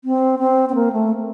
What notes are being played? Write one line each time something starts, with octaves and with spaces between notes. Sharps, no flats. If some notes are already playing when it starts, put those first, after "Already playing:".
C4
C4
C4
A#3
A3